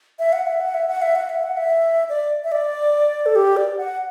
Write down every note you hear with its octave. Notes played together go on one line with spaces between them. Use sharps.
E5
F#5
E5
F#5
E5
F#5
E5
F#5
E5
F#5
E5
D5
E5
D5
A4
G4
D5
F#5